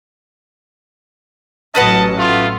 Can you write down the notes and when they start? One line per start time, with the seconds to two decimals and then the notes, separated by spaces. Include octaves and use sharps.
1.75 A1 F#3 C#4 B4 D#5 F#5 A5
2.17 A3 B3 F4